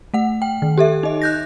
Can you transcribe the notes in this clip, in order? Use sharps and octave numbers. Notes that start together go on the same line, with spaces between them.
A3 F#5
G5
D#3
G4 A4 E5
D#4 D#5
F#6 G6 A#6